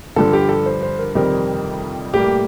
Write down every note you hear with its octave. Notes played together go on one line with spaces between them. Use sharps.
G2 D3 F3 A4
G4
A4
C5
C5
A#4
F2 C3 D#3 G3 C4 A#4
A2 G3 A#3 G4